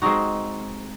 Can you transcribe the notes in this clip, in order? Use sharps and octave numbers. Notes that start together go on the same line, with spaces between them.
G#3 C4 D#4 F#4